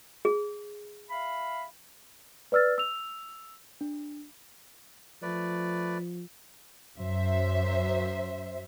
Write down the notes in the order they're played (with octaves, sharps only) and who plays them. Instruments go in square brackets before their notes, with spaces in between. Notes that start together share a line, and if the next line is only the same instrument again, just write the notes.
[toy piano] G#4
[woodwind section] E5 F5 B5
[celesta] B4 D5 E6 F6 A6
E6 F7
D4
[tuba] F3 [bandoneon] A3 B4 D5
[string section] F#2 C5 E5